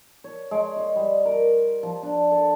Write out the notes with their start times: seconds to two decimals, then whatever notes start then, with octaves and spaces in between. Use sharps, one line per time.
0.24 C#5
0.51 G#3
0.76 D#5
0.96 G3
1.25 A#4
1.83 F3
2.03 D4
2.31 A4